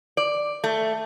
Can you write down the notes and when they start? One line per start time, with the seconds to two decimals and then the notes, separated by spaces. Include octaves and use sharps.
0.17 D5
0.64 A3